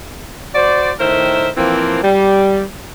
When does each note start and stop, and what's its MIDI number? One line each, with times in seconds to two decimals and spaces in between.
0.55 0.92 66
0.55 0.92 72
0.55 0.92 74
1.00 1.49 45
1.00 1.49 51
1.00 1.49 70
1.00 1.49 72
1.00 1.49 76
1.57 2.01 52
1.57 2.01 53
1.57 2.01 58
1.57 2.01 60
2.03 2.63 55